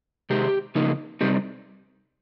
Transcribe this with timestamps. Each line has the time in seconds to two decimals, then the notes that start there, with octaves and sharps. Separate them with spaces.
0.30 C3 D#3 G#3 G4
0.75 C#3 F3 A#3 D#4
1.21 C3 G3 C4 D#4 G4